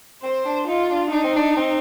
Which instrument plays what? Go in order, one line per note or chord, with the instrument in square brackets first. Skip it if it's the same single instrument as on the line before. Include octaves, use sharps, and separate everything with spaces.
[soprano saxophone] C4 [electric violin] C5
[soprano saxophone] D4
[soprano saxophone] D#4 [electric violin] F4
[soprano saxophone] D4
[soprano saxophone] D4 [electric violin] D#4
[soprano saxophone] C4
D4
C4